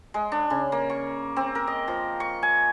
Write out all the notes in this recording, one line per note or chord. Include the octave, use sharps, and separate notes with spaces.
G#3
D4
C#3
A#3
C#6
C4
A#4
D#5
F3
C#6
G#5